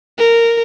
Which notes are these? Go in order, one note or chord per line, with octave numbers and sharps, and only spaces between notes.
A#4